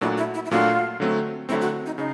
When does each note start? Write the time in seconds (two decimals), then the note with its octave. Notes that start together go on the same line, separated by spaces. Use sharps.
0.01 A#2 F#3 A3 D4 E4 F#4
0.18 E4
0.34 E4
0.45 E4
0.51 A#2 F#3 A3 D4 F4 F#4
1.00 D3 F#3 A3 C4
1.49 D3 F#3 A3 C4 E4
1.61 F#4
1.86 D#4
1.98 C#3 D#4